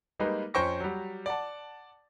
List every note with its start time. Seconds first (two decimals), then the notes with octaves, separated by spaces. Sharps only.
0.20 G3 G#3 A#3 D#4 B4
0.54 F2 C#4 C5 G5 C#6 A#6
0.80 F#3 G3
1.26 D5 F#5 A5